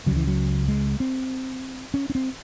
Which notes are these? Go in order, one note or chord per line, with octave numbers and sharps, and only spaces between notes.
C#2 C#3 F#3
E3
F#3
G#3
C4
C#4
C#4
C4